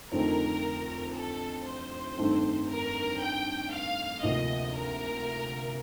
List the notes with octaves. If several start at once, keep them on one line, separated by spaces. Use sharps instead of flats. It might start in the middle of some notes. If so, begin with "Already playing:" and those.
F2 D3 A3 C4 D#4 A#4
A4
C5
G2 D#3 A3 C4
A#4
G5
F5
D2 C3 F3 A#3 D#5
A#4